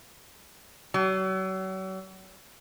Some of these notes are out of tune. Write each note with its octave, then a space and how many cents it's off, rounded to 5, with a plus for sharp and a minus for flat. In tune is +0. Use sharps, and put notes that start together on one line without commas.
F#3 +40